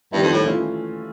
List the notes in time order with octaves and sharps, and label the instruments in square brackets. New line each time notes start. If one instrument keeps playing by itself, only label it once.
[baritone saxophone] G2 [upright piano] D#3 G3 B3 E4
[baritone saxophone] F2
A2
[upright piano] E3 A3 C#4 F4